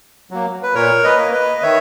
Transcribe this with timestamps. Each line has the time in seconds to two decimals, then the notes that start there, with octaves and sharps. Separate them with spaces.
0.31 F#3 A#3
0.63 B4
0.75 A#2 A#4 C#5
1.04 B4 D#5
1.18 A#3
1.33 B4 D#5
1.62 D#3 C#5 E5